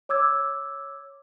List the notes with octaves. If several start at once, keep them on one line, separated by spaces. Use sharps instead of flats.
C#5 D6 E6 G#6